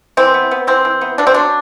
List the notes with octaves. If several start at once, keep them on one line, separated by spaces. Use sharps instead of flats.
E3 C4
B3
B3
E3 C4
E3
B3
B2 D4
C4
F#3 D4